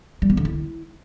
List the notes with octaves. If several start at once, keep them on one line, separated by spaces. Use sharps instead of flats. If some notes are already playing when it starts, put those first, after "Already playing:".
G3
B3
D3
E4